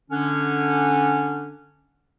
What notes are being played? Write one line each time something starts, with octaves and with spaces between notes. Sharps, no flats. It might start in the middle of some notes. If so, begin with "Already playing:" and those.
D3 C#4 D4